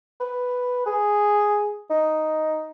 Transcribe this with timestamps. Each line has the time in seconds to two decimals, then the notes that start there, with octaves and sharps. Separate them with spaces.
0.20 B4
0.86 G#4
1.90 D#4